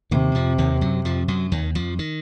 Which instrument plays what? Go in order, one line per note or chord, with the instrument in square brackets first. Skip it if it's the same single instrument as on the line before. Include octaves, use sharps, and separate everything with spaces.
[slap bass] D#2 D#3 [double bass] C3
[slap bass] F2 F3
D#2 D#3
F#2 F#3
F2 F3
F#2 F#3
D#2 D#3
F2 F3
D#3